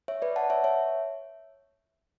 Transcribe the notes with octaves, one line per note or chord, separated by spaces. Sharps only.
C#5 E5
B4 D5
F#5 A5
C#5 E5
C#5 E5